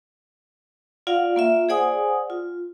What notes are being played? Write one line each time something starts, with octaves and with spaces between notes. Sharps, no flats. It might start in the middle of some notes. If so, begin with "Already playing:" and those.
F4 D5 F5 F#5
A#3 F4 E5
G#4 C5 D5 F#5 G#5 D#6
F4